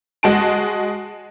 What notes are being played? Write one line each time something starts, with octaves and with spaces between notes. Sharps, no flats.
G#3 F#4 A5 D7